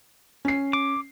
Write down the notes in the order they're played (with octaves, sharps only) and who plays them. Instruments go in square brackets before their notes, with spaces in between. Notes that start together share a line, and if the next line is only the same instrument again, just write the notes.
[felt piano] C#4 C7
[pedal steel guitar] D6